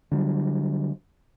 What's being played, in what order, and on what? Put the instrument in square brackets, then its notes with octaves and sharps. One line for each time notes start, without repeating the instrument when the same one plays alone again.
[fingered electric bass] D3 F#3 G3